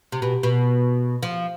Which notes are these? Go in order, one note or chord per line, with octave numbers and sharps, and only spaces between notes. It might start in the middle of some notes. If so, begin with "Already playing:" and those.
C3
B2
B2
F3